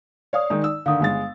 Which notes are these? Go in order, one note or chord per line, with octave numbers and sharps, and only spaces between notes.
C#5 D5 F5 D#6
D#3 G#3 D#4
E6
D3 D#3 F5 D#6
G1 G#3 A6